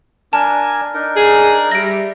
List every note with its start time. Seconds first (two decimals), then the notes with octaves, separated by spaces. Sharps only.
0.33 D4 A#4 G#5 A5
0.94 D4 D#4 A#4
1.16 G#4
1.71 G3 E5 A#6 D7